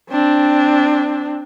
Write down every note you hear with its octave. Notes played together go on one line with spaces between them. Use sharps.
C4 D4